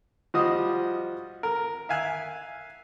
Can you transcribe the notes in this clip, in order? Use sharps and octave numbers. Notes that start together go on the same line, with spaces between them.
F3 G3 F#4 D#5 D#6
A#4
E5 F5 G#5 F#6